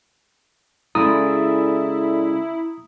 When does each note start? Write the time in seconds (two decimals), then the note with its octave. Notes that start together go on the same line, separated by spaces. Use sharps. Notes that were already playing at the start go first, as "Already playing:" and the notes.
0.95 C#3 G#3 E4 A4 D5 A#5 B5 D#6